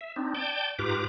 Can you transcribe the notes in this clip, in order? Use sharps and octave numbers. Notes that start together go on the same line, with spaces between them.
E5
C4 D4 D#4
D5 G5 A5 G6
G#2 F4 G4 B4 A#5 D6